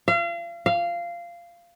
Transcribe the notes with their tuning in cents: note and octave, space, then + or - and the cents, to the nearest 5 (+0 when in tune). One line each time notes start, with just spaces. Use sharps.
F5 -35
F5 -15